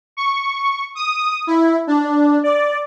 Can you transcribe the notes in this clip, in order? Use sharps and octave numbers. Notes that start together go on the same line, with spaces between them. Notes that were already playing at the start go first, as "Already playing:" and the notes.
C#6
D#6
E4
D4
D5